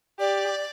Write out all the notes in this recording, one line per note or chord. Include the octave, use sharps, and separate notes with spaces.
G4 D5